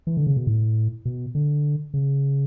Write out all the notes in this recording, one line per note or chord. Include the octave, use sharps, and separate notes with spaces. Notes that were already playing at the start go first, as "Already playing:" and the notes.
E3
D3
C#3
B2
A2
B2
D3
C#3